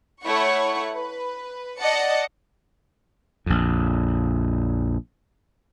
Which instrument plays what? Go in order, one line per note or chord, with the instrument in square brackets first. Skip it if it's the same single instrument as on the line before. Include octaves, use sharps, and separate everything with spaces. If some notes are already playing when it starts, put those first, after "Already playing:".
[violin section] A3 E4 C#5 F#5 C#6
B4
D5 D#5 F#5 A5 C#7
[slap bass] A#1 F2